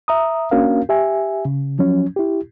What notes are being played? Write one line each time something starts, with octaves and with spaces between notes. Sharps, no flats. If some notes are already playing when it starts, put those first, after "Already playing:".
E5 A#5 D#6
A#3 C#4 D4 F#4 A#4 F5
G4 E5 G#5
C#3
F3 F#3 C#4
E4 G4